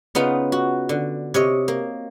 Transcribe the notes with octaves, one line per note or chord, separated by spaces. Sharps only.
C#3 B3 D#4 F4 B4
F#4
D3
C3 C#5 D#5
A#3